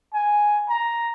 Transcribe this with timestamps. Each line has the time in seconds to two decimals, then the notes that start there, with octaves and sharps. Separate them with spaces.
0.14 G#5
0.69 A#5